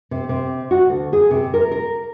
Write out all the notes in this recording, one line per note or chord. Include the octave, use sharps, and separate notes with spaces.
C3
C3
F#4
D2
G#4
C3
A#4
A#4